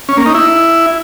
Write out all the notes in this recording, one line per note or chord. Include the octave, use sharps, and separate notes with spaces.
C#4
A#3
D#4
E4